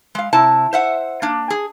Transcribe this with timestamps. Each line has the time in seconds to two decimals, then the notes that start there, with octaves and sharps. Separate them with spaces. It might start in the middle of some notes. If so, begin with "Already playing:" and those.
0.15 G#3 F5
0.33 C3 E4 A5
0.73 C5 E5 F#5
1.22 A#3 D4
1.50 G#4